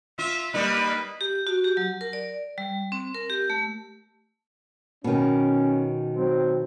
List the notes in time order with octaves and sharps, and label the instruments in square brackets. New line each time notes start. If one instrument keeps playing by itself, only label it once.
[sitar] F4 [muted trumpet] E5
[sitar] G3 A#3 D#4 [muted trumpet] B4
[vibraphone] G4
F#4
G4
F#3
A#4
D5
G3
C4
A#4
G4
A3
[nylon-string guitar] B2 D#3 [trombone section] C#4
[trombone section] F#3 C4